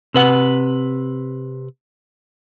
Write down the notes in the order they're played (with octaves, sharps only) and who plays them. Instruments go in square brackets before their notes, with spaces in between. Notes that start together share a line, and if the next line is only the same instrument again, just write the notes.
[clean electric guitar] C3 B4 F#5